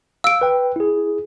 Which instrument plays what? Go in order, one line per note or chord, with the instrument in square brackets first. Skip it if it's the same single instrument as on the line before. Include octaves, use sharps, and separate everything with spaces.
[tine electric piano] F5 [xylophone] E6 D7
[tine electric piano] B4 G5
E4 G#4